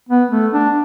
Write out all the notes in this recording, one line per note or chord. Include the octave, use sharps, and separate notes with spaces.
B3
A3
D4